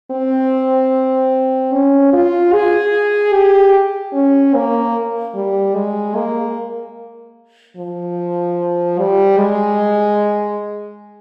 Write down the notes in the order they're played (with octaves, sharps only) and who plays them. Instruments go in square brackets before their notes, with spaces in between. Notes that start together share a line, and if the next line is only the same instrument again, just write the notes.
[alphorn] C4
C#4
F4
G#4
G4
C#4
A#3
G3
G#3
A#3
F3
G3
G#3